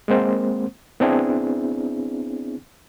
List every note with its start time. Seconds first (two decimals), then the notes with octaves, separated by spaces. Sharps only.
0.08 G#3 A#3 C4 C5
1.00 B3 C4 D4 E4 G#4